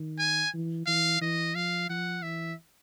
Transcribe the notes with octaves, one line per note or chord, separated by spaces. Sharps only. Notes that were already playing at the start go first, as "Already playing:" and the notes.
Already playing: D#3
G#5
E3
E3 F5
E3 D#5
F3 F5
F3 F#5
E3 E5